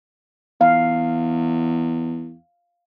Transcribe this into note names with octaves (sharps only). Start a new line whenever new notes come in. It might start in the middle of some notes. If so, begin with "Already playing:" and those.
E2 F5